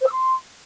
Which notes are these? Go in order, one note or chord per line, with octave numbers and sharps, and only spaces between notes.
C5
E6
C6